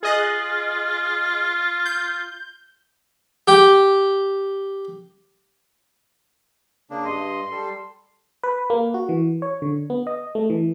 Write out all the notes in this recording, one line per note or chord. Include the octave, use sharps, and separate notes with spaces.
F4 G#4 D#5 F#6
G6
G4 G5
C#3 A#3 D4
G2 D#5 C6
G3 A4
B4
A#3
F#4
E3
C#5
D3
B3
D#5
A3
E3